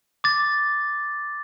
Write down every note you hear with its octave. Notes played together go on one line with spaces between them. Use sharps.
D6 A6